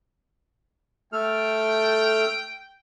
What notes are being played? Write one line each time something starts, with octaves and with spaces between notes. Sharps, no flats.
A3 A4 G5 F6